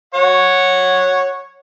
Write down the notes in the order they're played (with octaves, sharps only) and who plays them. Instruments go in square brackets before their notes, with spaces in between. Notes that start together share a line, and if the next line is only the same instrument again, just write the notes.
[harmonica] C#5 F#5